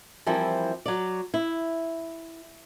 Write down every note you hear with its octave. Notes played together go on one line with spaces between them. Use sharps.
E3 F3 G3 C4 E4 A#4
F#3 D5
E4